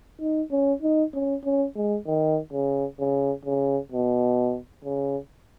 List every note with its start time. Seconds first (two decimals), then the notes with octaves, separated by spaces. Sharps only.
0.20 D#4
0.51 C#4
0.82 D#4
1.14 C#4
1.44 C#4
1.75 G#3
2.06 D#3
2.52 C#3
2.99 C#3
3.45 C#3
3.92 B2
4.84 C#3